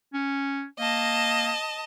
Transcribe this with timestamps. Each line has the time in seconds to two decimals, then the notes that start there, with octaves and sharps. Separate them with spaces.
0.13 C#4
0.79 A#3 D#5 A5